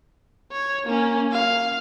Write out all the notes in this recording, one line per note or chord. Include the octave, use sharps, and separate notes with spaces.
C#5
A#3 C#4
F5